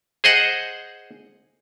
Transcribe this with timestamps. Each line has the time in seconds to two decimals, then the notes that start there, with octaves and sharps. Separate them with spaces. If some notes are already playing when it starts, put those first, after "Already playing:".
0.24 G#4 C5 D#5 F#5